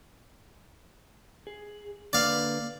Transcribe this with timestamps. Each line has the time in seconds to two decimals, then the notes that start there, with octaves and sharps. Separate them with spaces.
1.47 G#4
2.13 D3 A#3 B4 D5 F5